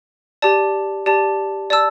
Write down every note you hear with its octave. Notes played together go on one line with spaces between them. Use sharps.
G4 D5 A5
G4 D5 A5
D5 A5 E6